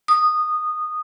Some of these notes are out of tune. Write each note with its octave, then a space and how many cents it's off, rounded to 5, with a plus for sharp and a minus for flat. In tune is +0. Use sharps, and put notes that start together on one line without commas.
D#6 -15